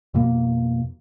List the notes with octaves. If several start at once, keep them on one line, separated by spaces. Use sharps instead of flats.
F2 B2 A#3